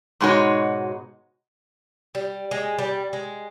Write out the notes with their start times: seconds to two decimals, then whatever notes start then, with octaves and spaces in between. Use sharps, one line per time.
0.21 G#2 B2 G#3 D#4 F#4 C#5
2.15 G3
2.51 G#3
2.79 G3
3.13 G#3